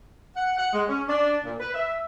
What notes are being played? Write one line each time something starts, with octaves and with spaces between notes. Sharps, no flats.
F#5
F#5
G#3
C#4
D4
A#2
B4
E5